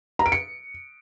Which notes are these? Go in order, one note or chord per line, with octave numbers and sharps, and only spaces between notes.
A#5
D7
C#7